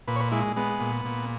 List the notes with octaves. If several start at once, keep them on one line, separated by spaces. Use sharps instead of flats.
A#2 B4
C#5
B4
G#3 E4
G#3 B3
A#2
A#2